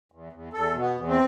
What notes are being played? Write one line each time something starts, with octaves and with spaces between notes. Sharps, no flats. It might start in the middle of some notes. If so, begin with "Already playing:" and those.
E2
E2
E2 A4
B2
B3
E2
C4